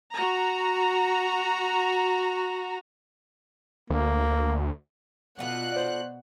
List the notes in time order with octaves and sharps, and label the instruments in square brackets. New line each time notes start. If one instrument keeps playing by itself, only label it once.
[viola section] F#4 A#5
[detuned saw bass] D2 [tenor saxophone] A#3
[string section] B2 F#6 [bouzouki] D4 F4 A4 [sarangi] F#5
[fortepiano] C5 D5